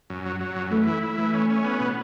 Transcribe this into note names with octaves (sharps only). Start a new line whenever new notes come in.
F#2
F#3
F#3
F#2
E3 A3
E4
E4
E3 A3
C#4
C#4
B3
B2